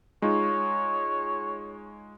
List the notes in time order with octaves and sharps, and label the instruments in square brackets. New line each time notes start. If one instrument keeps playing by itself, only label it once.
[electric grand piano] G#3 D#4 F4 [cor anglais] C#5